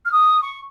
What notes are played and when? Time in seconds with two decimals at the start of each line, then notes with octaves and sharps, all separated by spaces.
0.05 F6
0.12 D#6
0.42 C#6